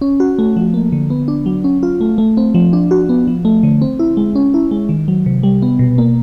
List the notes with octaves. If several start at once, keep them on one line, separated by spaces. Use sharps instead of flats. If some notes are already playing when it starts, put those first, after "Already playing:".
C#4
F#4
A3
F3
A#3
D3
B3
D4
F#3
C#4
F4
A3
A3
C4
F3
D4
F#4
B3
F3
A3
D3
C4
E4
G#3
C#4
E4
G#3
D#3
F#3
C3
G3
B3
B2
A#3